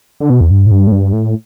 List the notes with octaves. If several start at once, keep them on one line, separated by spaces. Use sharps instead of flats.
D3
B2
E2
G2
A2
G2
A2
G2
A2